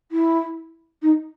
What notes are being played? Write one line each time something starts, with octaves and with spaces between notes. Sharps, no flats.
E4
D#4